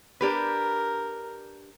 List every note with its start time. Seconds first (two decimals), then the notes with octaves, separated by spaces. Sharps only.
0.21 D4 G4 A#4 B4